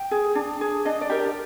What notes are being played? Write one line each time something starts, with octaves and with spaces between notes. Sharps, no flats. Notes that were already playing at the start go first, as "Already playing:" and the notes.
Already playing: G5
G#4
D4
G#4
D4 D#5
D5
G4 A#4
D5